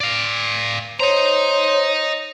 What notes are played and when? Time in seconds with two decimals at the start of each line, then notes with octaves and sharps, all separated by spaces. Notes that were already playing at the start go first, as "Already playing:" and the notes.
0.01 D5 F5
1.00 C5 C#5 D#5 A#5